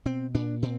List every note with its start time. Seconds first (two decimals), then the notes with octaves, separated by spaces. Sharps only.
0.06 B2 C4
0.34 A#2 D4
0.62 A#2 C4